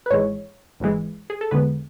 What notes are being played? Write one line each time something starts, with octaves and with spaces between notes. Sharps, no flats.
B4
G#1 G#2 E3 G#3 C#5
G#1 G#2 E3 G#3
G#4
A4
E2 D3 G#3 B3 B4